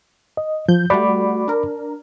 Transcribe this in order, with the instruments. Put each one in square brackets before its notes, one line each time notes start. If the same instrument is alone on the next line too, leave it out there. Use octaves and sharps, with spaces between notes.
[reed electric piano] D#5
[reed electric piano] F3 [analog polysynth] G6
[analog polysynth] G3 A3 F#4 [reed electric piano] D5 B5 D6
[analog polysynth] D4 A#4